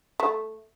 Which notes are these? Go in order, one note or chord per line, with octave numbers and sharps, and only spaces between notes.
A3